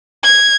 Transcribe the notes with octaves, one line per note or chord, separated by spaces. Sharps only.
G#6